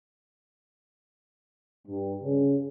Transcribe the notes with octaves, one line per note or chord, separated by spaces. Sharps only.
G2
C#3